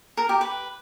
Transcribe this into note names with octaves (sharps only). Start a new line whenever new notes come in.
A#4
G4
B4